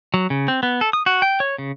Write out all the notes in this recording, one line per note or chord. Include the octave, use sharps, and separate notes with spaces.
F#3
C#3
C4
B3
A4
D#6
F#4
G5
C#5
C#3